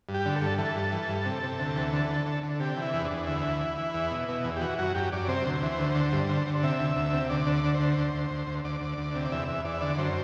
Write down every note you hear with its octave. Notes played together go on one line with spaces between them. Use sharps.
G2
G4
D3
A4
G2
E3 A4
G2
E3
G2
C3
C3
D2
E3
D3
D3
D3
D3
C3 G4
E3
E4
E2
D4
E2
D2 E4
E3
E3
E3
E2
B2
B2
E2
G4
E3 F#4
F#2 F#4
F#2 G4
F#2 D5
C3 C5
D2
E3
D2
D3
G2
D3
D3
C3 E5
D2
D2
C3
D2 D5
D3
D5
D3
C5
D2
D2
D2
D2
D2
D2 D5
D2
D2
C3
D5
E2 E5
E2
E2 D5
E5
D3 D5
F#2 C5